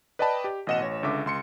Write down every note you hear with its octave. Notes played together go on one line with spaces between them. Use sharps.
B4 D5 D#5 G5 A5 B5
G4
A1 B2 D#5 F#5 E7
A1 C#5 A#6
C#2 D3 E5 D6
C#2 C6 C#7